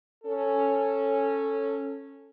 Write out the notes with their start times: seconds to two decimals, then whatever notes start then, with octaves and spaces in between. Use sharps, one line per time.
0.24 C#4 A4